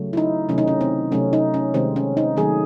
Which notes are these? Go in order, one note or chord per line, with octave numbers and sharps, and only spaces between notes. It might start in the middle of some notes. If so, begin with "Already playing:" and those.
Already playing: C#3 F#3 A3
E4
D#4
C3 D#3 F#3 A3 C#4
D#4
C#4
C4
C3 F#3 A3 C#4
D#4
C#4
C3 D#3 G#3 C4
C#4
D#4
D#3 F#3 A3 G#4